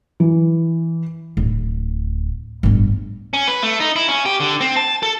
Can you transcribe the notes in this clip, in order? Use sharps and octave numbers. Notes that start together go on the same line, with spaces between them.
E3
D1
D1 G1
C#4
B4
A3
D#4
E4
C#4
G4
D3
C4
A5
A4